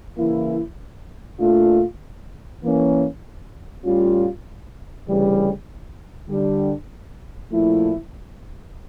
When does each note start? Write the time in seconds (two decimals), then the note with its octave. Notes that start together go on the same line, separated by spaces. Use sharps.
0.18 C#3 E3 A#3 E4
1.40 A#2 A3 D4 F4
2.63 E3 A#3 C#4
3.85 A2 G3 C#4 F4
5.07 D2 C#3 E3 G3
6.29 D3 G3 D4
7.52 A#2 F3 A3 E4